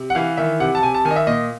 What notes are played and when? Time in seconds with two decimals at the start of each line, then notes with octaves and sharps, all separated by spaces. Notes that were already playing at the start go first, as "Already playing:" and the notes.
Already playing: C3
0.10 F#5
0.15 E3 F5
0.37 D#3 E5
0.60 C3 F#5
0.75 A5
0.83 C3 G#5
0.94 A5
1.05 D#3 G#5
1.11 D#5
1.16 E5
1.27 A#2 D#5